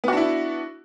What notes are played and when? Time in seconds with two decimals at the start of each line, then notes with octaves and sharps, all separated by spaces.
0.04 B3
0.08 F#4
0.12 D4
0.17 E4